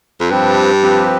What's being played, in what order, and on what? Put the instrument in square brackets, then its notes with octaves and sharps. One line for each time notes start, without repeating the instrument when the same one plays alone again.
[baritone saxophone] F2
[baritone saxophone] G2 [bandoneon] F3 C4 G4 B4
[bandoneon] F3 C4 G4 B4